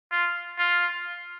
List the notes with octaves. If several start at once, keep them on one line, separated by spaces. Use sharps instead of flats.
F4
F4